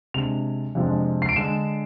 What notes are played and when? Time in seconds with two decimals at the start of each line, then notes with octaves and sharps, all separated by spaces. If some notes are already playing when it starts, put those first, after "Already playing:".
0.14 C3 G#3 D4 F7
0.75 F2 C3 F3 G#3 D4
1.22 C7
1.29 D7
1.36 D3 G#3 D4 E7